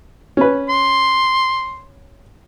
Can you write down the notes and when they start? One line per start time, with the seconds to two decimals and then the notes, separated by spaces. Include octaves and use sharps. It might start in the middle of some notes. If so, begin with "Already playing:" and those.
0.37 C#4 B4
0.69 C6